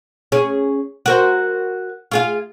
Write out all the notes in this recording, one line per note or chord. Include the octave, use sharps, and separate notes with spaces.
C#4 G#4
F#4 A#4 C5
F4 G#4 F5